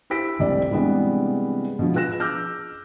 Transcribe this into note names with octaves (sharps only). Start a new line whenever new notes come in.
E4 G4 C5 E6 B6 D7
F1 C2 C4 D5
C3 E3 G3 G#3 B3 D4
B2 F3
F4 G#4 B4 F#6 A#6 E7
D6 E6 F6 G6 A#6